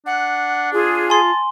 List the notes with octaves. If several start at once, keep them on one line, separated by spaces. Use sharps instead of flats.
D4 F#5
F4 G#4
G#5 A5 C6